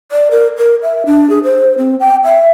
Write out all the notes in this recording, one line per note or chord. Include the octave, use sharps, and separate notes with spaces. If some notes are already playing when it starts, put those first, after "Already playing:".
D5
A#4
A#4
E5
D4
G#4
C5
C4
G5
E5